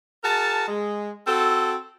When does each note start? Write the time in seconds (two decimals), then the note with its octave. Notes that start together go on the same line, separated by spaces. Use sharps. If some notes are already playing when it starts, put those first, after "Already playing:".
0.24 F#4 G#4 A#4 A5
0.68 G#3
1.26 C4 F#4 A4